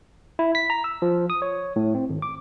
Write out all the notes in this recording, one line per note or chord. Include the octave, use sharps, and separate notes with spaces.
E4
B6
A#5
E6
F3
D#6
C#5
A2
C4
G#1
D6